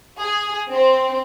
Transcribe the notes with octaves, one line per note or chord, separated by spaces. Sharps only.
G#4
C4